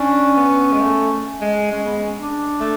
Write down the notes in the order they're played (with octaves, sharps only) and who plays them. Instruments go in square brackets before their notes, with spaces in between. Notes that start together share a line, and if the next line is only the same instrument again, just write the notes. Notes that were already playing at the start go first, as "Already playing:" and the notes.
Already playing: [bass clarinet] C#4 [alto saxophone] D4
[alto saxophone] B3
G#3
A3
G#3
[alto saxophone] G#3 [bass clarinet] C#4
[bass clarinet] B3
C#4
D4
[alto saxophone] A3